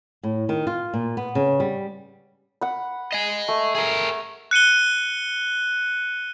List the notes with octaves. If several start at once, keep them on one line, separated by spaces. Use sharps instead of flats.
A2
D#3
F4
A#2
B3
C#3
G3
F#5 B5
D#5 G#5
A3
G#4 A#4
F#6 C#7 D#7 G7